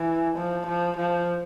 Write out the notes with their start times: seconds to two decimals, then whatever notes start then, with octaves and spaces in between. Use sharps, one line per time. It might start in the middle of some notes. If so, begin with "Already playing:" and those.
Already playing: E3
0.37 F3
0.67 F3
0.97 F3